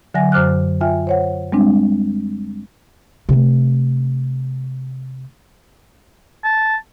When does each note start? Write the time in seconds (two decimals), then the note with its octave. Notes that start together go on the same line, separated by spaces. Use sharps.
0.14 D3 F#3 E5 F#5 G#5 A#6
0.32 F#2 C5 D6 F6 F#6
0.81 F4 E5 G5 G#5
1.07 C5 C#5 F#5
1.52 G3 G#3 C4 D4
3.29 C3 A3
6.44 A5